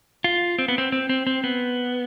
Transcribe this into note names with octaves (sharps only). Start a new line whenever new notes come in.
F4
C4
B3
C4
C4
C4
C4
B3